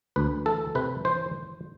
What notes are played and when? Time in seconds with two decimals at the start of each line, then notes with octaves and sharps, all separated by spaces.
0.16 D2 B4
0.46 E3 A4
0.75 C3 B4
1.05 E3 C5